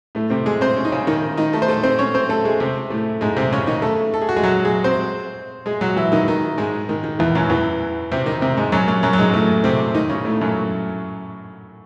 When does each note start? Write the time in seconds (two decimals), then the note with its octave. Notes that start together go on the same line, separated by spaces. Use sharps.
0.15 A2 A3
0.30 C3 C4
0.46 G#3 G#4
0.61 C4 C5
0.76 C#4
0.85 D#4
0.92 C#3 C#4
1.07 D#3 D#4
1.37 D#3 D#4
1.53 A3 A4
1.62 C5
1.68 A3 A4
1.83 C4 C5
1.99 C#4 C#5
2.14 C4 C5
2.29 A3 A4
2.45 G#3 G#4
2.60 C3 C4
2.90 A2 A3
3.21 G#2 G#3
3.37 C3 C4
3.53 C#3 C#4
3.67 D#3 D#4
3.82 A3 A4
4.14 A4
4.21 G#4
4.29 F#4
4.36 G#3 G#4
4.43 F#3 F#4
4.65 G#3 G#4
4.84 C4 C5
5.66 G#3 G#4
5.81 F#3 F#4
5.96 E3 E4
6.12 D#3 D#4
6.28 D#3 D#4
6.58 G#2 G#3
6.89 D#3
7.04 D#3
7.19 E2 E3
7.35 F#2 F#3
7.50 E2 E3
8.12 C3 C4
8.26 D#3 D#4
8.41 C3 C4
8.57 G#2 G#3
8.72 F#2 F#3
8.88 F#2 F#3
9.03 F#2 F#3
9.13 F#3
9.19 G#2 G#3
9.33 A2 A3
9.64 C3 C4
9.94 D#3 D#4
10.10 C#3 C#4
10.25 A2 A3
10.41 F#2 F#3